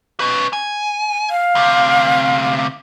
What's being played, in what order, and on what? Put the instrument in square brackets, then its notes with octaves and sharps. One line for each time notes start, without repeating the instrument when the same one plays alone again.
[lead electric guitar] C#4 B4
G#5
[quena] F5
[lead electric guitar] D2 C3